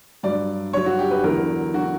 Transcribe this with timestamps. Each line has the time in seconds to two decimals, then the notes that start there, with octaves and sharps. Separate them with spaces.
0.23 G2 F#3 D5
0.73 G2 F#3 C#5
0.86 F#4
0.99 G4
1.11 B4
1.23 E2 D3 F#3 A#4
1.74 D3 F#3 F#4